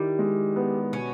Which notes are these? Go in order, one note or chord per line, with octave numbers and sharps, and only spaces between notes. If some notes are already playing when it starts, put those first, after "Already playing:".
Already playing: D#3 G3 E4
G#3
B3
B2 C#4